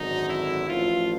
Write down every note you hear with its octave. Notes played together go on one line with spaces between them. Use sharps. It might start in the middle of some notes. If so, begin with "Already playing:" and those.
Already playing: G#1 F#2 D3 F#3 D#4
E4
A1 A2 F3 F4